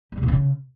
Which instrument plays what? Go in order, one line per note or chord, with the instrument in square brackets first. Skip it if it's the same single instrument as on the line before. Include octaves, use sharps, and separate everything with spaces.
[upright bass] G3
C3
A#2
C#3